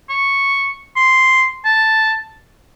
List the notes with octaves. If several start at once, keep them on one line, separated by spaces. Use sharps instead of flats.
C#6
C6
A5